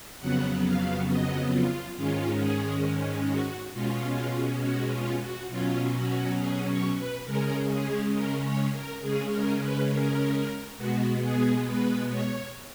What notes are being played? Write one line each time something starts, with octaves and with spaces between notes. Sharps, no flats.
F2 C#3 F#3 B3 F#5
F5
D#5
F4
G#2 D#3 G#3 C#4 F4
G#4
F#4
B2 G#3 C#4 F4
F#4
F4
F#4
B2 F#3 C#4 F4
F#4
G#4
C#5
B4
C#3 G#3 C#4 A#4
G#4
A#4
C#5
A#4
C#3 G#3 C#4 G#4
A#4
B4
A#4
B2 G#3 B3 F#4
G#4
B4
C#5